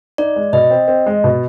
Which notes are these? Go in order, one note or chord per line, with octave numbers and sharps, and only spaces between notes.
D#4 D5
G#3
B2 D#5
C4
C4
G#3
B2